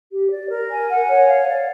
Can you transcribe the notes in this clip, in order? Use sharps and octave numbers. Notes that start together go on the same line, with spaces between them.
G4
D5
A#4
G#5
F#5
C#5
F5
D5